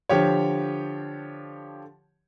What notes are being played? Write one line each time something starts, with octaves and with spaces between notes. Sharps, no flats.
D3 F3 G4 C#5